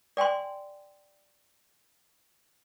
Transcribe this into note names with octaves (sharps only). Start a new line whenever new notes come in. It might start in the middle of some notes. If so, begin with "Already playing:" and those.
D5 G5 G#5 C6